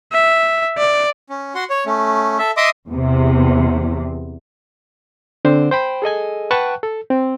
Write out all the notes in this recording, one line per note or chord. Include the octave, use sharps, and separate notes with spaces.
E5
D5
C#4
F#4 F#5 C6
C#5
A3 C#4
A4 E5
D#5 E5 C6 D6 D#6
E2 C3
D3 C4 D4 C5
C5 G5 B5
G#4 A4 D#5 G#5
B4 F#5 G5 A5 C#6 F#6
A4
C4